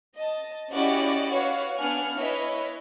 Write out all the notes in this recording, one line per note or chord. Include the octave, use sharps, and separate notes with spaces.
D#5 A5
C#4 E4 F#4 G4 D5 D#5
F#4 B4 C#5 F5
B3 D4 F#5 G#5 F6
E4 B4 C#5 D#5 E5